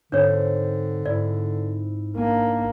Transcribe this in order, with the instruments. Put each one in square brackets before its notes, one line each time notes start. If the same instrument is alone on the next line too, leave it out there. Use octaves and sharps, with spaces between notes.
[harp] G#2 C4 C5 [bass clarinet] D3 [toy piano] D4 C#5
[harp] G#2 E4 [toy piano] D5
[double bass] A#3 [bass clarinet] D4 [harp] G#5